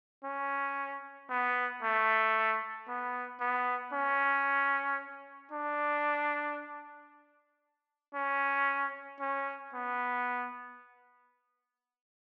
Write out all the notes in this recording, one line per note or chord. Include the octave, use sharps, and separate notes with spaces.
C#4
B3
A3
B3
B3
C#4
D4
C#4
C#4
B3